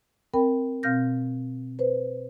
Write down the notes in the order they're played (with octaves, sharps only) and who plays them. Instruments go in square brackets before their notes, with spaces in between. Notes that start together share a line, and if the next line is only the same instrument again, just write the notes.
[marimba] C4 A#4 G5 B5
B2 C4 F5 F6 G6 A#6
B4 C5